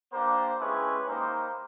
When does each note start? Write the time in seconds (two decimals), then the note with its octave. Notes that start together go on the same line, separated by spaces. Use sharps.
0.13 A#3 D4 G4 A#4 C5
0.60 G#3 C#4 E4 G4 B4 C#5
1.08 A#3 D#4 G4 A#4 C5